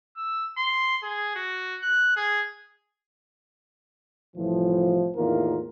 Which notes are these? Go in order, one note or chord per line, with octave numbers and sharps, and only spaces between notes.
E6
C6
G#4
F#4
F#6
G#4
C2 A2 E3 F3
E2 A2 D#3 A#3 F4 A#4